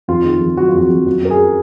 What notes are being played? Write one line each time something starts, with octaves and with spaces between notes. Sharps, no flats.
F2 F4
D#3
F2
F#3 F#4
F4
F2 F#4
F2
F#2 F#4
F#2 A#4
G#4